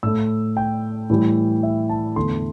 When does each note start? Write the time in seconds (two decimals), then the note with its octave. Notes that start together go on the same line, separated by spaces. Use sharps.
0.03 A2 A3 E6
0.57 G5
1.10 A2 E3 G3
1.63 E5
1.89 A5
2.16 E2 D3 A3 C6